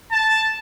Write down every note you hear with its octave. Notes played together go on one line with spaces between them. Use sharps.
A5